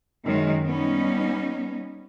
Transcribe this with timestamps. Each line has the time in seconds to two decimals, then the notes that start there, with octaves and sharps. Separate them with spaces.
0.24 F#2 D#3 G#3
0.64 G3 B3 C#4 D#4